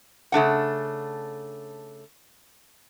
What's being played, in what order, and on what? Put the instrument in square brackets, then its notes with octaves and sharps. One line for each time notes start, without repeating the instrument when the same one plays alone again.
[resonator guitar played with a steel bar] C#3 A3 D4 F#5